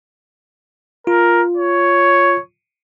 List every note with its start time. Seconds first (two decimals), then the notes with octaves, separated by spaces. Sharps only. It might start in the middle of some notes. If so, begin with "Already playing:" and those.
1.07 F4 A#4
1.57 C#5